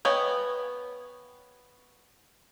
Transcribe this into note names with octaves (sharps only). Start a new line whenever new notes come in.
B3 C#5 D#5 G5 G#5